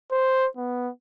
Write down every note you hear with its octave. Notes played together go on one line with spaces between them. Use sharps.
C5
B3